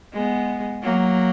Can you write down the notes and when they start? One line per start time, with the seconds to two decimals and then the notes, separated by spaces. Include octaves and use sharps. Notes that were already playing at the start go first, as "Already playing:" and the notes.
0.13 G#3 B3
0.83 F#3 A#3